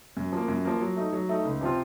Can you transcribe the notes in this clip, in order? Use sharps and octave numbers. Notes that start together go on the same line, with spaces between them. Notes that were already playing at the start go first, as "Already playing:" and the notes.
F#2
F3 A#3
F#2
F3 A#3
F#3
A3 D#4
F#3
A3 D#4
C#2
C3 F3 C4 F4